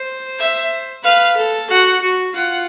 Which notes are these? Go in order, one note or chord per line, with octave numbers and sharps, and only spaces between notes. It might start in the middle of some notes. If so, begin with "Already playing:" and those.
Already playing: C5
E5
B4 F5
A4
F#4 F#5
F#4
F4 F#5